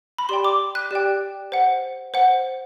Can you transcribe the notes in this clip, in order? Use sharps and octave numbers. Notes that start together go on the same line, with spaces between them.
B5
G4 D5 G5 C6
D6
F#6
G4 D5 G5
C5 F#5
C5 F#5